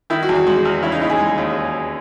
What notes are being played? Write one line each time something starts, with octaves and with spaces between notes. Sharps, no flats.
D#3 E4
F#4
E2
F#4
G#3 F#4
E2
C#3 E4
D#4
D#2 E4
G#4
G#3
D#2